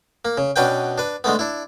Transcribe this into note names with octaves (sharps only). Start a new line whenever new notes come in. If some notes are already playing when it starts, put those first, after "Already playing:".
A#3
C#3
B2 C#4 D4 B4 F#5 G5
D4 B4
D3 G#3 A3 B3
D4 E4